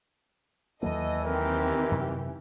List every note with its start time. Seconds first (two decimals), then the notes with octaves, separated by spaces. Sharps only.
0.83 D#2 E3 F#3 A#3 A4 D#5
1.25 D#3 C4 G4 A#4
1.91 F#2 C3